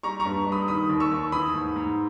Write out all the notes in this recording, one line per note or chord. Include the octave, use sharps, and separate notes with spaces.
G3 A#5 C#6
A#5 C#6
G2
G3
B5 D#6
D#3 B5 D#6
D#2
C#6 E6
D#2
E3 B5 D#6
G#2
G#2